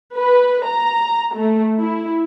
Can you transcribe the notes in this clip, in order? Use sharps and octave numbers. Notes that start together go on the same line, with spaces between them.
B4
A#5
A3
E4